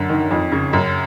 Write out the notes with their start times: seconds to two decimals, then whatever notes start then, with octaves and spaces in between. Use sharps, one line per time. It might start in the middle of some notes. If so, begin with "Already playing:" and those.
Already playing: F#2 D3
0.09 D#3
0.31 F2
0.52 C#3
0.73 F#2